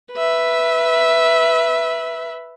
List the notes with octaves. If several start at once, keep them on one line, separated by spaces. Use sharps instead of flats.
B4 E5